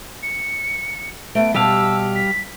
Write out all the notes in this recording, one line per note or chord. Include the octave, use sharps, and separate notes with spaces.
C#7
A3 B3 D7
B2 G3 G4 F5 G#5 A5 E6
B6